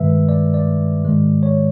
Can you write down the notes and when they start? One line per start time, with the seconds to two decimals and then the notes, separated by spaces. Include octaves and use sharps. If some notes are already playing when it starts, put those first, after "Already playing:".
Already playing: G2 D#3 G#3 B4 E5
0.29 D5
0.54 D5
1.05 G#2 D#3 G#3
1.43 C#5